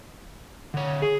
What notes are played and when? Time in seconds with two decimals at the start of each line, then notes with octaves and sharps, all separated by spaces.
0.74 D3 C#5
1.02 G#4